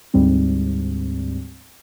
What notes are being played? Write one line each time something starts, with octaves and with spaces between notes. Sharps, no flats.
D2 G#2 G3 C4